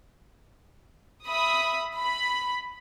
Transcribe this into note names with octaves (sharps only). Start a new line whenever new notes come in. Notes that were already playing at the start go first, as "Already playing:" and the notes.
E5 B5 D#6
B5